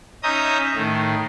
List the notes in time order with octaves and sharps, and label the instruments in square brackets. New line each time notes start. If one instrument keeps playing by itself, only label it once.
[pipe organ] C#4 D#4 E5 A#5 D#6 G6
A2 D#3